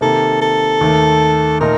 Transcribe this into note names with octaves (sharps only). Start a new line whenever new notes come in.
C3 D#3 A#3 A4
A4
D#2 D#3 A3
A#2 A3 D#4 A#4